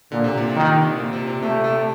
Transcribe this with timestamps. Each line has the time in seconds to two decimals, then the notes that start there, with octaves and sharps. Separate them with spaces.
0.12 A#2 D3
0.24 C3
0.37 A#2
0.50 C3
0.56 D#3
0.99 A#2
1.13 C3
1.27 C3
1.42 C3 A3
1.64 C3